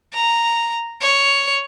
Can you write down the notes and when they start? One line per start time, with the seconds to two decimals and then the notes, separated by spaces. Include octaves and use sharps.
0.13 A#5
1.01 C#5